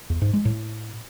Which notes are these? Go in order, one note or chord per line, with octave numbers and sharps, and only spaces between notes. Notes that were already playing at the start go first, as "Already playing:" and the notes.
E2
G#2
G#3
A2